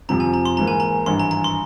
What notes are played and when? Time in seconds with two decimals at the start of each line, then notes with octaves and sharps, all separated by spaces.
0.09 F2 C3 F3 C4 A#5
0.20 G#5
0.34 A#5
0.45 C6
0.57 G#2 E3 A#3 A#5
0.68 G#5
0.80 A#5
1.06 G#1 G2 E3 C6
1.20 A#5
1.31 A#5
1.44 C6